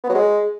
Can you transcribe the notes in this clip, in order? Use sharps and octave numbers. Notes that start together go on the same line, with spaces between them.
B3
F#3
G#3